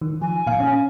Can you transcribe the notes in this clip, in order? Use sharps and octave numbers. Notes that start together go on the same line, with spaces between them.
D#3
F3 G#5
A#2 F5
C#4